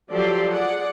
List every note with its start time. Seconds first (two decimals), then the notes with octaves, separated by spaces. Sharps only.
0.10 F3 F#3 G4 A4 D5 C6
0.52 G#4 D5 F#5